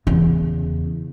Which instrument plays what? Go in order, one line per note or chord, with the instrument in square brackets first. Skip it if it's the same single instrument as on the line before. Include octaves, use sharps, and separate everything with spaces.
[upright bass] E2 C#3